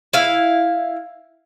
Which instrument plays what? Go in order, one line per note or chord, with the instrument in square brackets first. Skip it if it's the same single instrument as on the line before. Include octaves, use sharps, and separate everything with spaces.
[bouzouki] E4 F5